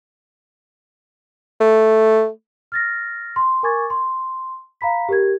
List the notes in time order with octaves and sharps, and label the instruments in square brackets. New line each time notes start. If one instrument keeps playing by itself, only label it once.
[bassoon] A3
[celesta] F6 A6 A#6
C6
A#4 G#5 C#6 D6 G#6 A6
C6
F5 A#5 B5 B6
G4 A#4 G#6